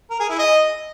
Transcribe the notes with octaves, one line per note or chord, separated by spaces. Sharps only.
A#4
G#4
E4
D#5